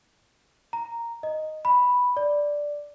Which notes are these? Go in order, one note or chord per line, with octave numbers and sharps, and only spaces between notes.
A#5
D#5
B5
D5